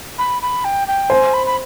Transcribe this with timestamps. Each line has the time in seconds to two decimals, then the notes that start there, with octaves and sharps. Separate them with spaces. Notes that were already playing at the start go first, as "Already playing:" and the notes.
0.19 B5
0.42 B5
0.64 G5
0.88 G5
1.10 C5 G#5
1.34 B5
1.46 B5